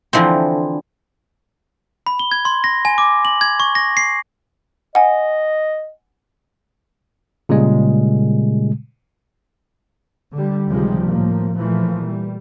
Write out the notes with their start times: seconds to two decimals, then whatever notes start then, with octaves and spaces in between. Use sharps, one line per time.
0.13 D3 E3 F3 C4
2.07 B5
2.19 G7
2.32 G#6
2.45 C6
2.64 A#6
2.85 G#5
2.98 D6
3.25 F#7
3.41 G#6
3.60 C#6
3.75 A#6
3.97 C7
4.95 D#5 F#5 G#5
7.49 A#2 C#3 G3 G#3
10.33 D3 G3
10.69 C#2 C3 D#3 F3 G3 G#3
11.07 A2 F3 A#3
11.57 A#2 E3 F3 A3
12.05 G3